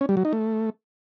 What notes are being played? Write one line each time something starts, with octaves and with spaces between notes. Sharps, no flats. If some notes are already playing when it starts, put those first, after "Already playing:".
C#4
G3
F#3
D#4
A3